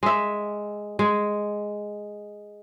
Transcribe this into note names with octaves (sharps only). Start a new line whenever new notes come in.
G#3 E5
G#3